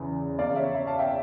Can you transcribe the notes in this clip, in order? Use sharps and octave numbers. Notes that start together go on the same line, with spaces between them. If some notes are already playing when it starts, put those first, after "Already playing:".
Already playing: E2 C#3 E3
E2 C#3 F3 D5 F5
C#5 E5
C#5 E5
F5 A5
E5 G5